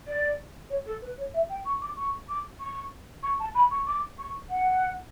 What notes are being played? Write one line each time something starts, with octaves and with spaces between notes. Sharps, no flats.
D5
C#5
A4
B4
C#5
E5
G5
C#6
D6
C#6
D6
C#6
C#6
A5
B5
C#6
D6
C#6
F#5